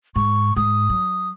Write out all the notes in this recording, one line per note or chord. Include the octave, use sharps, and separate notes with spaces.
G#2 C#6
G#2 D#6
F#3